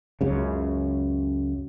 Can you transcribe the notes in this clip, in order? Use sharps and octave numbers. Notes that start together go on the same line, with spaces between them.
C#2 F#2 C#3